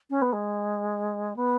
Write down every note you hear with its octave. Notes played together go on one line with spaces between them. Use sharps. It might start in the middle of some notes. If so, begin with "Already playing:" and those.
C#4
B3
G#3
B3